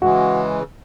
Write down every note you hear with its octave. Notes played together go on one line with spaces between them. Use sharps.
C#3 E3 G#3 F#4